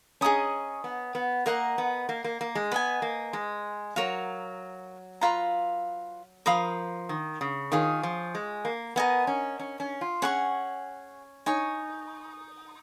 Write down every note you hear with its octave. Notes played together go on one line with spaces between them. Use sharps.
C#4 G#4 D#5 A#5 D#6
B3
B3
A#3 A#4 D#5 F#5 A#5
B3
A#3
A#3
A#3
G#3
B3 B4 D#5 G#5
A#3
G#3
F#3 A#4 C#5 F5
F4 B4 F5 A#5
F3 A#4 F5 B5 D#6
D#3
C#3
D#3 F4 G#4 C#5
F3
G#3
A#3
B3 A#4 D#5 G#5
C#4
C#4
C#4
F4
C#4 G#4 C#5 F#5 C#6
D#4 C#5 G#5 C#6